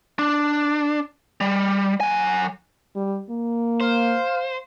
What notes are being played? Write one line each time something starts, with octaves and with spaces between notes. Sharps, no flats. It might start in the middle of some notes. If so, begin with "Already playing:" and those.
D4
G3
F#3 G#5
G3
A#3
C5 F5